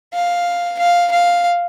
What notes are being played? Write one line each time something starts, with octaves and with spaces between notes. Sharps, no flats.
F5
F5
F5